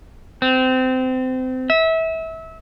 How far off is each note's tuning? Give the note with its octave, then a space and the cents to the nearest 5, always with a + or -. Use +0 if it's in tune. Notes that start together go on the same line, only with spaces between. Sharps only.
C4 -25
E5 -25